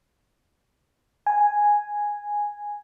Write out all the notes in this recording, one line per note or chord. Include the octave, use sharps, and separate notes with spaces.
G#5